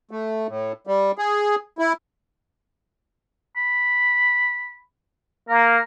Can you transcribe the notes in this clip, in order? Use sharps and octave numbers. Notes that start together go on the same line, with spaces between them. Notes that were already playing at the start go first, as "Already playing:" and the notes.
A3
A2
G3
G#4
E4
B5
A#3 A#4